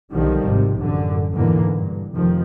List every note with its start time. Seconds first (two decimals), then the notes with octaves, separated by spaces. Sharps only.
0.11 B1 D3 D#3 F3 G3
0.44 G#1 C3
0.78 A1 F#2 D3
1.32 E2 G#2 B2 D3 E3 A#3
1.75 G2
2.12 F1 D#3 F3